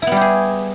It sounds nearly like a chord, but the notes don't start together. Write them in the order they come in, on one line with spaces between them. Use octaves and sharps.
E4 B3 G3 G4 G#4